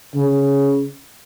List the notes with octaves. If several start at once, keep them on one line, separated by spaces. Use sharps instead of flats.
C#3